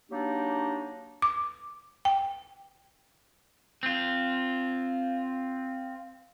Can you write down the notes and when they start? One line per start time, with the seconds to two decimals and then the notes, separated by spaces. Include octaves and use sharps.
0.10 F#3 A#3 D4 D#4 G4
1.22 D6
2.05 G5
3.83 C4 F4